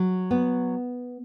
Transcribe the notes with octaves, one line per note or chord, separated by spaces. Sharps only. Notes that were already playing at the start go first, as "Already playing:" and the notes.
Already playing: F#3
B3